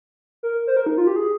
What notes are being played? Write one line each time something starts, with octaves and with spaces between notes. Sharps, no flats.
A#4
C5
A#4
D#4
F4
G4
G#4